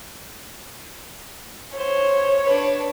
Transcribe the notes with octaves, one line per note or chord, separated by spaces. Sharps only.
C5 C#5
D4 B4